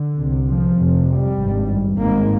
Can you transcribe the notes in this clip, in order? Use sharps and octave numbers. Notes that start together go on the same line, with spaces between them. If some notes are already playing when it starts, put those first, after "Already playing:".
Already playing: D3
C2 C3
F3
F1 F2 C3
G3
G#1 G2
G#1 G#2 A#3